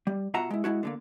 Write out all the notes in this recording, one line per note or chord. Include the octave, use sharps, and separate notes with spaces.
G3
B2 F4 F#4 E5 F#5 A#5
G#3 E4
G#3 A3 E4 F#4
D3 G#3 A#3